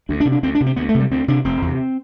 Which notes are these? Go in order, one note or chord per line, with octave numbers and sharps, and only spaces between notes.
D2 D4
D4
C3
D4
D2 C4
D4
C3
C4
D2 B3
A3
C3
G3
D2 C4
C3 D4
F1 C4
E2
C3